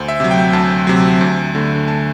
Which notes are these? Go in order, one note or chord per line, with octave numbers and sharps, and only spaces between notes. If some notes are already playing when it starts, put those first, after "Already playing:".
Already playing: D2 C5
E5
C3 F#3
G5
D2 A5
C3 F#3
D2
D3 A3
A5